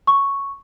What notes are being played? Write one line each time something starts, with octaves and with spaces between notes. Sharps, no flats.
C#6